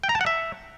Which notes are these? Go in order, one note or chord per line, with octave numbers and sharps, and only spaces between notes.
G5
A#5
A5
F#5
E5